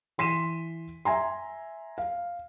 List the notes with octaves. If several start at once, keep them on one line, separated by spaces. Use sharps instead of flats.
E3 C6 B6 D#7 E7
E5 G#5 A#5 C6
F5